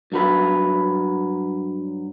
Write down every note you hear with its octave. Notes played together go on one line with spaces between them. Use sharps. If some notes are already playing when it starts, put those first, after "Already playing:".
G2 F#3 B4